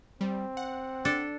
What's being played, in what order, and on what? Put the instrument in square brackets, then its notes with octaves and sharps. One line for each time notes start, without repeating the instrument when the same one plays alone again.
[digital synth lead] G3 [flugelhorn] C4
[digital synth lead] F#5
[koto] D4 A4